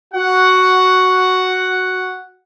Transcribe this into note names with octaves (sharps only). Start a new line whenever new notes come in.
F#4 F#5